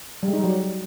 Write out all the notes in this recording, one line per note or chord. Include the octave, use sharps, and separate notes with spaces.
G3
G#3
D#4
G3
F#3